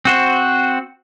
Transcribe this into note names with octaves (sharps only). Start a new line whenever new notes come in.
C4 F#4 C5